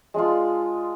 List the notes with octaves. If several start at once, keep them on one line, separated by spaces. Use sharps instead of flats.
G#3 D4 F4